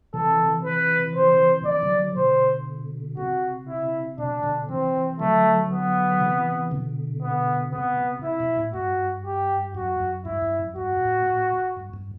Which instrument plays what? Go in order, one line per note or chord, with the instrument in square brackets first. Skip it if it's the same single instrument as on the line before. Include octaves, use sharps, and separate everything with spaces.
[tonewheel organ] C3 E3 [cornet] A4
[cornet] B4
C5
[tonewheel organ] C3 E3 [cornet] D5
[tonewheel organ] E3
D3 F#3
D3 F#3
[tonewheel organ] B2 D3 [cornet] C5
[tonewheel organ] C3 [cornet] F#4
[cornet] E4
[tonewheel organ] B2 [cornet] D4
[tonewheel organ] B2 D3
[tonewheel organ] C3 E3 [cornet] C4
[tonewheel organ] D3 F#3 [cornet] A3
[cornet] B3
[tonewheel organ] C3 E3
B2 D3
[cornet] B3
[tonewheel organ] C3 [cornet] B3
[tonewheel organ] C3
[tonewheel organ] C3 [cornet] E4
[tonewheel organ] B2
A2
[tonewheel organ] G2 [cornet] F#4
[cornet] G4
[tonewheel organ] F#2 [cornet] F#4
[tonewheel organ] F#2
[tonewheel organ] G2 [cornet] E4
[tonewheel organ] G2
F#2
[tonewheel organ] G2 [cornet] F#4
[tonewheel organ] G2
A2
A2
G2
G2